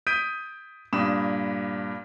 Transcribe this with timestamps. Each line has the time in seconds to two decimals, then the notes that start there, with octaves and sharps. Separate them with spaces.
0.07 D#6 G6 B6 D7 D#7
0.93 G2 A#2 B5 D#6 E7